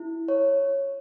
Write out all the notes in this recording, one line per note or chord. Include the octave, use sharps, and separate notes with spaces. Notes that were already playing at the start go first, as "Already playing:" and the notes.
Already playing: E4
C#5